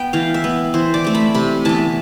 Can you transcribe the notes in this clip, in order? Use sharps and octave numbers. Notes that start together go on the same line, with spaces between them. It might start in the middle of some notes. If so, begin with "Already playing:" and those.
Already playing: B3 G5
E3 F5
E5
B3
E3 C5
D5
A3 C4
B5
C3 B5
E3 B3 A5